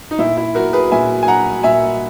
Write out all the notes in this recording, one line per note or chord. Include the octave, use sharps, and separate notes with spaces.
D#4
A#2 E4
E4
F#3 F#4 A#4
G#4 B4
A#2 E5 G#5
G#5
F#3 F#5 A#5
A#2 E5 G#5